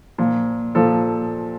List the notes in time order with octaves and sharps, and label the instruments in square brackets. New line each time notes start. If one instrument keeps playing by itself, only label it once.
[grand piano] A#2 F3
A#2 F3 A4